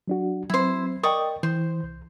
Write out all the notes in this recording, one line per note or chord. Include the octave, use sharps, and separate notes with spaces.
F#3 D4 F#4
F#3 C4 E4 C5
A#4 D5 D#5 G5 C#6 D#6
E3 C5
C2